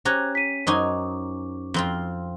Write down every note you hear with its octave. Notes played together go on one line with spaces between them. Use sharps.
C#4 G4 C5 A#5 F#6 G#6
B6 D#7
F#2 D#4 C5 G#5 C#6 D6
F2 C4 F4